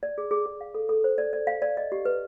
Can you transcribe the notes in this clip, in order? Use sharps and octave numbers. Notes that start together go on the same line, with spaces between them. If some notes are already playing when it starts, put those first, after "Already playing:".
D5
G#4
G#4
G#4
F5
A4
A4
C5
D5
D5
F5
D5
D#5
G4
B4